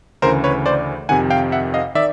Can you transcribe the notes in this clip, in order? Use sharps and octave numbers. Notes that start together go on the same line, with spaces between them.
D2 C#3 E3 A#4 C5
B4 C#5
C5 D5
F2 C3 D#3 F#5 G#5
F5 G5
E5 F#5
D#5 F5
D#3 D5 E5